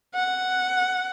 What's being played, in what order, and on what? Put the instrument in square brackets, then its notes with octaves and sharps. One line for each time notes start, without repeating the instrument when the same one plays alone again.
[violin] F#5